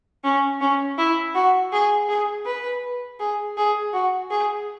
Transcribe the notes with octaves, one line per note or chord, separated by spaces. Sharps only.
C#4
C#4
E4
F#4
G#4
G#4
B4
G#4
G#4
F#4
G#4